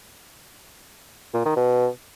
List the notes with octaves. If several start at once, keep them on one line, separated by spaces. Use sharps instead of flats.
A#2
D#3
B2